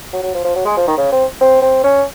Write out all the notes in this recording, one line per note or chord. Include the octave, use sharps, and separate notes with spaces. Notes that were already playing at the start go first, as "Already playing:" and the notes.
F#3
F#3
F3
F3
F#3
G#3
F3
D#3
C#3
C4
C4
C4
C#4